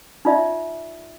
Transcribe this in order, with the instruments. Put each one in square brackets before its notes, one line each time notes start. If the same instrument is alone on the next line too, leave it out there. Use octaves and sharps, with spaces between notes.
[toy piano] D#4 F4 D5 E5